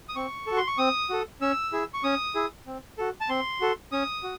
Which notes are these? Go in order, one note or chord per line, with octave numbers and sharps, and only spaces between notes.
D#6
C4 C#6
F#4 A4
C6
C#6
C4 D#6
F#4 A4
C#4 E6
E4 G#4
C#6
C#4 D#6
E4 G#4
C4
F#4 A4
A5
C4 C6
F#4 A4
C#4 D#6
F#4